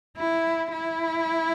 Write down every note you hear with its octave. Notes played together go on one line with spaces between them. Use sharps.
E4
E4